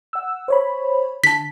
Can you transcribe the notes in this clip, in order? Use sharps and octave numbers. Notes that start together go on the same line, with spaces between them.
F#5 E6
C5 C#5 B5
D3 A5 B6